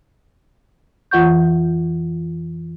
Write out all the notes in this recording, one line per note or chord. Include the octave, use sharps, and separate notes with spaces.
F2 E3 F4 F#5 C#6 G6